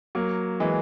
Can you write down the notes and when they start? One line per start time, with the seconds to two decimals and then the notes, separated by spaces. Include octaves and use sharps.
0.15 F#3 A#3
0.60 E3 G#3